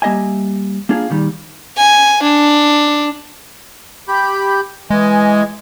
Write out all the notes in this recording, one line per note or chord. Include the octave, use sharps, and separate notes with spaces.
G3 A#3 G4 D#5 E5 G#5
A#3 D4 F4 G#4 F5
A#2 D#3 G3
G#5
D4
G4 B5 G6
E3 G#3 D#5 G#5